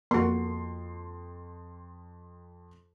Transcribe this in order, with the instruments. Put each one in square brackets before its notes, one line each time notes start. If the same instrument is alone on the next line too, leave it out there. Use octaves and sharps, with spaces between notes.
[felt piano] F2 C6 [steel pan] A#3 F#4